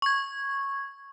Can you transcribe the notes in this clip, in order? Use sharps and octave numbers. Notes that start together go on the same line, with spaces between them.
C#6 G#6